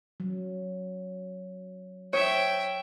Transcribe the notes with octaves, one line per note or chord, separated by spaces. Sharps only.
F#3
C#5 E5 G5